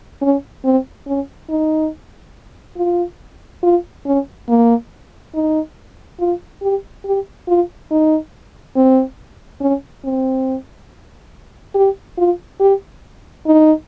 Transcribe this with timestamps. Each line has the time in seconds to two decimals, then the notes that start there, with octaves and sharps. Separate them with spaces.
0.22 C#4
0.65 C4
1.07 C#4
1.50 D#4
2.77 F4
3.63 F4
4.06 C#4
4.49 A#3
5.35 D#4
6.20 F4
6.62 G4
7.05 G4
7.48 F4
7.91 D#4
8.76 C4
9.61 C#4
10.04 C4
11.75 G4
12.18 F4
12.60 G4
13.46 D#4